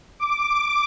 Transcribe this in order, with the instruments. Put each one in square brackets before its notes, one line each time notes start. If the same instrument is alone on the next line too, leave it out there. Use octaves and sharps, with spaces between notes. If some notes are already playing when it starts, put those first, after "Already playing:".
[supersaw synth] D6